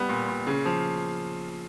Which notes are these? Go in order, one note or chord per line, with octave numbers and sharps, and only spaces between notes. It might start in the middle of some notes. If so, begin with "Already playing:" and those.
Already playing: G3 B3
A#2
A#2
C#3
F3